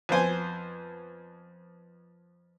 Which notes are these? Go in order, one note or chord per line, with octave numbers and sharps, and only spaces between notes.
F2 B3 C5 G#5